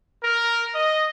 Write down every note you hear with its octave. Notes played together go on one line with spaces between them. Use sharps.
A#4
D#5